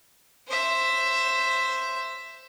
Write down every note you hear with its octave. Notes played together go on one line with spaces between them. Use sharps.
C5 E5